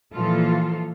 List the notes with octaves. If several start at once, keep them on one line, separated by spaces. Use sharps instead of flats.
A#2 E3 F3 F4 A4